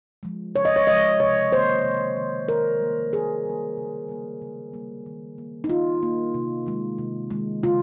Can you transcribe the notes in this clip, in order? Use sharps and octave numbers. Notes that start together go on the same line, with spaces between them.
F3 G#3
C#3 C#5
D#5
C#5
F3 G#3 D#5
C3 C#5
D#3 A#3 C5
C3
D#3 A#3
D#3 A#4
G3 A#3
D#3 G#4
G3 A#3
C#3
G3 A#3
C#3
G3 A#3
D#3
A#3
D#4
D#3 F4
A#3
C3
D#3 G#3
C3
D#3 G#3
C#3 F4